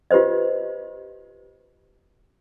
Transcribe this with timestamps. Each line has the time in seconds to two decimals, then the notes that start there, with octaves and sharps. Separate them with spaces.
0.11 F4 G4 B4 C5 D#5